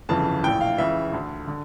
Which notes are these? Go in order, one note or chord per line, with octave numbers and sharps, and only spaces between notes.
G1 F2 C#3 E3 A5
A#1 A2 E3 G5
F5
C#2 C#3 E3 E5
D2 D3
D3